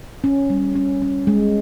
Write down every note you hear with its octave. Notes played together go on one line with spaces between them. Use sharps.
C#4
G3
C#4
C#4
G#3